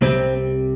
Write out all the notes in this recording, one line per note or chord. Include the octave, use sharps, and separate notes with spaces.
C2 C3 G3 C4